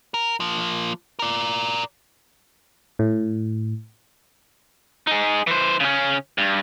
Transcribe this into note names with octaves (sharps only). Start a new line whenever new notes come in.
A#4
F3 A#3
A#4 D5
A2
D#4 G#4
E3 C5
C#3 C#4
G2